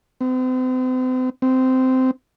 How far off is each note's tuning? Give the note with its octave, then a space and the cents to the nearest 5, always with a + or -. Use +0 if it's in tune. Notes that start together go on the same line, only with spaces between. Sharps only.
C4 -40
C4 -15